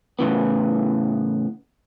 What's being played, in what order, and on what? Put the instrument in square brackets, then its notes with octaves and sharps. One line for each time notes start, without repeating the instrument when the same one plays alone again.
[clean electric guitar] A2 C#3 E3 B3